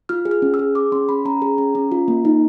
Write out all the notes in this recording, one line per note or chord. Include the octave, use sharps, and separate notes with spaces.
F4 F6
G#4
F6
C#4
E6
G#4
G#4 D6
C#4 C6
C#4 B5
C#4 A#5
G#4
C#4
C#4
F4
A#3
D#4